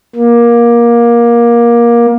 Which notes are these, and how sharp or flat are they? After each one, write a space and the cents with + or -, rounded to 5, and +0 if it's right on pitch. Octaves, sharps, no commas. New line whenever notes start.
A#3 +20